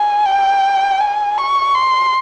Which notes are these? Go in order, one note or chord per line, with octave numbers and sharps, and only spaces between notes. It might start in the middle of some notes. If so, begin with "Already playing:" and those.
Already playing: G#5
G5
G#5
C#6
C6